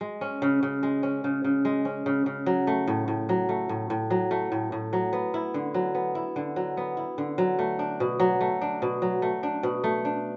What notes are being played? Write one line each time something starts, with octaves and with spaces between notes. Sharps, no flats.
G#3
C#4
C#3
C#3
G#3
C#4
C#3
C#3
G#3
C#4
C#3
C#3
F#3
A3
A2
A2
F#3
A3
A2
A2
F#3
A3
A2
A2
F#3
B3
E4
D3
F#3
B3
E4
D3
F#3
B3
E4
D3
F#3
A3
D4
B2
F#3
A3
D4
B2
F#3
A3
D4
B2
A3
D4